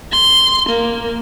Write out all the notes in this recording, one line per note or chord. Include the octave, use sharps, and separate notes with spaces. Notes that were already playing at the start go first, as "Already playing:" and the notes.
C6
A#3